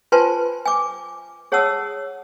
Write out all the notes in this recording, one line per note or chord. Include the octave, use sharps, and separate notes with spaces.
F4 B4 C5 G#5 A5 C6
G#5 D6
G#4 C#5 F#5 A5 D#6 E6